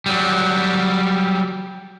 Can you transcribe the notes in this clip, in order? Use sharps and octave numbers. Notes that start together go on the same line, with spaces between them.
F#3 G3